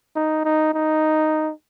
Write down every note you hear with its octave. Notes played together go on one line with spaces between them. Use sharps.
D#4
D#4
D#4